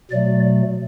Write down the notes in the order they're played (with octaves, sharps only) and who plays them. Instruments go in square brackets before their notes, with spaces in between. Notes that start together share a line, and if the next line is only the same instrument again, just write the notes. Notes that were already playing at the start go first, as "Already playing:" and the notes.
[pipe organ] B2 F#3 A3 D5